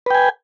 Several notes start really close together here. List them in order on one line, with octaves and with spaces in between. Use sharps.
B4 G5 G#5